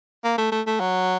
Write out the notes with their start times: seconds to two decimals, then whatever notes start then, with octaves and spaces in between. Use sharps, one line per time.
0.24 A#3
0.38 A3
0.52 A3
0.67 A3
0.80 F#3